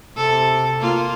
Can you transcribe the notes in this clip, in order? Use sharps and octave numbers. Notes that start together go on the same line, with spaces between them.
C3 A4
A#3 F4